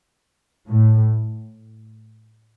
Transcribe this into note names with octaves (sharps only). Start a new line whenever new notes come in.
A2